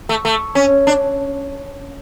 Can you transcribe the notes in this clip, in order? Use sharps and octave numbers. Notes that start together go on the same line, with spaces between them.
A3
A3
C#4
D4